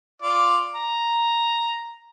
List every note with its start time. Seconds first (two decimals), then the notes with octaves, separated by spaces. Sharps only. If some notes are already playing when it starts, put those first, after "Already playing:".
0.22 F4 D5
0.74 A#5